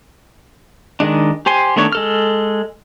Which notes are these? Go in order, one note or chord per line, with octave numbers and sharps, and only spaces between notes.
D#3 G#3 D4
G4 C5 G#5 C6
D#3 A3 B3 D4 C#5
G#3 A4 F6